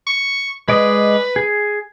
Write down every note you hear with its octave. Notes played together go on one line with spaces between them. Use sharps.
C#6
G#3 B4 D5 D#5
G#4